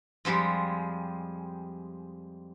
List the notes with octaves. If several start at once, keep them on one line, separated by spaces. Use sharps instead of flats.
F2 F3 G3 G#3